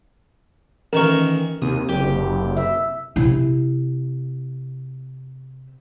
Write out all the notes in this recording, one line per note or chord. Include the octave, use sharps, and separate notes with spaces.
A1 D#3 A#4 C#6
D#2 C3 D#6
F#1 G4
E5
C3 E4